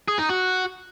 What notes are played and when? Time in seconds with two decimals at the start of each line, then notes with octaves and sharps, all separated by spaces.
0.08 G#4
0.19 D#4
0.29 F#4